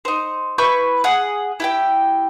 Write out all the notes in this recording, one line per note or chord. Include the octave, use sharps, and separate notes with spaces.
D#4 C5
E4 B4 C#6 G6
G#4 F#5
E4 G4 G5